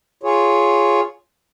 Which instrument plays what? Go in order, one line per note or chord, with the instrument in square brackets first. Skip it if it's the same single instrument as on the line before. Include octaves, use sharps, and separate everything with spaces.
[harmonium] F4 G#4 C#5